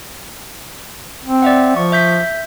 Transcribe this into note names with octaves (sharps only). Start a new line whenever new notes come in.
C4
D5 E5 F#5
F3 C#6
E5 G6 B6